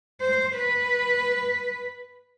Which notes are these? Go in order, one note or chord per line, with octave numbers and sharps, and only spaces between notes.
C5
B4